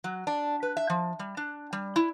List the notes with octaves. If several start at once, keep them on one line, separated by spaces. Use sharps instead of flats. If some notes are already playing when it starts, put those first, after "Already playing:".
F#3
D4
B4
E5
F3
G3
D4
G3
E4